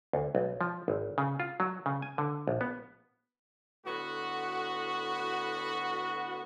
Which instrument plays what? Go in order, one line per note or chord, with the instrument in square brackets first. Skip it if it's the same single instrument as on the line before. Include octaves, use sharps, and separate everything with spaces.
[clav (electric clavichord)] D2
B1
F3
G#1
C#3
F4
F#3
C#3
G#5
D3
A#1
B3
[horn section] A2 D3 B3 F#4